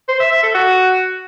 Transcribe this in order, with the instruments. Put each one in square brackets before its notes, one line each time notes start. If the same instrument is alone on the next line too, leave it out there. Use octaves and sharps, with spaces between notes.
[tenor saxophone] C5
E5
E5
A4
F#4